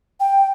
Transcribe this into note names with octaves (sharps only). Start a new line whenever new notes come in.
G5